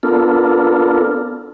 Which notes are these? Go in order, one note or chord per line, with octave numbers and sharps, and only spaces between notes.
B3 D4 F4 A4 A#4